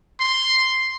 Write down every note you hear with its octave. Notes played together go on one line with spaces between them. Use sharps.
C6